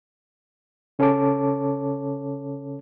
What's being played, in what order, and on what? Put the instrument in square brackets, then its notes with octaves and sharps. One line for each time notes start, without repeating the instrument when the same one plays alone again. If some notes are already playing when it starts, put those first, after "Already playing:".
[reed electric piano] C#3 C#4 A4 C#5 A5 D6